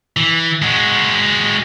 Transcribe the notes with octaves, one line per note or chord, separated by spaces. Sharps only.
E3
G#3 F#4